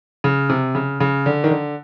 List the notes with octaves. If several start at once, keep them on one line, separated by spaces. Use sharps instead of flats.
C#3
C3
C#3
C#3
D3
D#3
D3